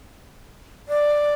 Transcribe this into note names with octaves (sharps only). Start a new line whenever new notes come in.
D5